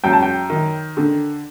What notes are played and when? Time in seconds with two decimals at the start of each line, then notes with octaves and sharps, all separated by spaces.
0.04 F#2 G5
0.13 A5
0.23 G5
0.50 D#3
0.97 D3